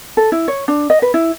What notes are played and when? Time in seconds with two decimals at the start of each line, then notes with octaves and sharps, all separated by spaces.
0.17 A4
0.32 E4
0.48 C#5
0.68 D4
0.90 D#5
1.02 B4
1.14 E4